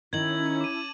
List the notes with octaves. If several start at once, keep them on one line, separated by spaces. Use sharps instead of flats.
D#3 C#4 D#4 E4 G#6 F#7
A5 D6 D#7